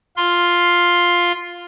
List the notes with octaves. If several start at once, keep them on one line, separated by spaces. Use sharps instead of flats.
F4 C6